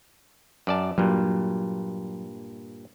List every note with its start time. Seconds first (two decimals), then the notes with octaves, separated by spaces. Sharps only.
0.67 F#2 D5 A5
0.98 G2 A#2 F#3